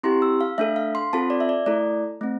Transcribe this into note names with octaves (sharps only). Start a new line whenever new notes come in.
C4 E4 G4 C6
E6
F5
A3 D4 A4 E5
F5
C6
C4 F4 A4 A5
D5
E5
D5
A3 E4 A4 D5
A3 C4